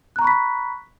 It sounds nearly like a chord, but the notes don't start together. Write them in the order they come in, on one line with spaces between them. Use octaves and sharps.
F#6 A#5 C#6 B5 B6